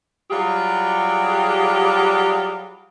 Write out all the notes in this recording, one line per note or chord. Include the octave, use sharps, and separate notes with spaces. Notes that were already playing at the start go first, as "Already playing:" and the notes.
F#3 G3 F4 G4 G#4